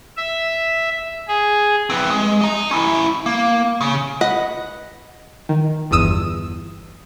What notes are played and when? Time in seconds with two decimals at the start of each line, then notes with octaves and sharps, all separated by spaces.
0.17 E5
1.28 G#4
1.90 C4 B4
2.10 G#3
2.41 D#5 A#5
2.71 C#4 E4
3.26 A#3
3.81 C#3
4.21 B4 D#5 F#5
5.49 D#3
5.91 G1 E2 D#6 E6 D#7